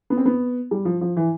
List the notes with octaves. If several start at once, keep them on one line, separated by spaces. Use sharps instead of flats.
B3
C4
B3
G3
F3
F3
E3